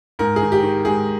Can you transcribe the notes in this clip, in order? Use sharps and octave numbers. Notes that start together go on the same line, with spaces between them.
G#2 A#4
G#4
D#3
G4
D#3
G#2 G#4